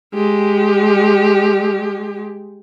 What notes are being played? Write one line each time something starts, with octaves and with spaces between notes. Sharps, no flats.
G#3 G4